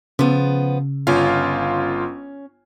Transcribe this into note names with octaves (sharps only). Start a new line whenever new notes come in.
C#3 F3 B3
G1 C#4 F4 F5